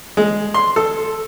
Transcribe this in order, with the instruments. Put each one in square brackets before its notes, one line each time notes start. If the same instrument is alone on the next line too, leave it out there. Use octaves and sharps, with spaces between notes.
[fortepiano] G#3
C6
A4